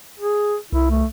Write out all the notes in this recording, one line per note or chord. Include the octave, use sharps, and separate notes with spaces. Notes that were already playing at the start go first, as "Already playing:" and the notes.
G#4
C2 E4
A3